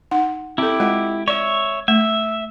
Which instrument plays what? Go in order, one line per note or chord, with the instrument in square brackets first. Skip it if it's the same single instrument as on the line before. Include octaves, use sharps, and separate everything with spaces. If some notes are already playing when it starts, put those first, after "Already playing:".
[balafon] D#4 F#5
[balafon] C4 A4 [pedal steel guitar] E4 G4
[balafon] G#3 F4 D#5
[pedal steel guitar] C#5 E5 [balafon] D5
[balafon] A3 [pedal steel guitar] E5